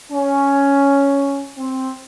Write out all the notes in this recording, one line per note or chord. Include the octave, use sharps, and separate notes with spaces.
C#4
C4